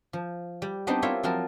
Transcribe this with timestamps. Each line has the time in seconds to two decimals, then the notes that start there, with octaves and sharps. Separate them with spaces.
0.13 F3
0.62 G3
0.87 B3 C4 D4 D#4 G4 C5
1.02 E4 F4 A#4 C#5 E5 F5
1.23 F3 F#3 C4 F4 A#4 A5